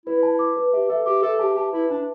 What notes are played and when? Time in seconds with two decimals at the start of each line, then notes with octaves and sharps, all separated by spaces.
0.06 E4 B4
0.23 A5
0.39 D6
0.57 B4
0.73 G4 E5
0.89 A4 E5
1.06 G4 D6
1.23 A4 E5
1.39 G4 A5
1.56 G4 A5
1.73 E4 B4
1.90 D4 A5